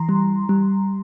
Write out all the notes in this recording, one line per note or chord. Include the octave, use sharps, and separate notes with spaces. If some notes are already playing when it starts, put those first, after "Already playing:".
Already playing: E3 A#5 C6
G3
G3